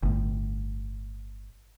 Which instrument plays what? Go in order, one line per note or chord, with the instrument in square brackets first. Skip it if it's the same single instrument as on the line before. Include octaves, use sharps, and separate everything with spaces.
[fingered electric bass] G1 A2